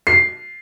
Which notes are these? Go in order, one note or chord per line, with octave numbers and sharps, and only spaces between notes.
C7